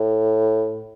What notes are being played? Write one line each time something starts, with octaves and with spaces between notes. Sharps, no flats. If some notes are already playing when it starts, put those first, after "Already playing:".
Already playing: A2